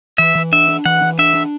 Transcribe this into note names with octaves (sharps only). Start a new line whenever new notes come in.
E3 E5
E3
D4 E5
D4
E3 F#5
E3
D4 E5
D4